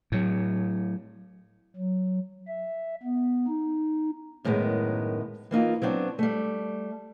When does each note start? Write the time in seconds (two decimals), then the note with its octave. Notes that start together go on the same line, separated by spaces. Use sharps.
0.12 A2 F#3
1.76 F#3
2.48 E5
3.03 B3
3.47 D#4
4.44 F#2 A2 D#3 G#3 B3
5.51 E3 A#3 D#4 F4
5.82 F#3 B3 C4 D4
6.19 G3 A3